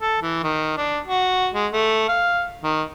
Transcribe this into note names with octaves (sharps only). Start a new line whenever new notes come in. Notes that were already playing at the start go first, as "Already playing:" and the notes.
A4
E3
D#3
D4
F#4
G#3
A3
F5
D#3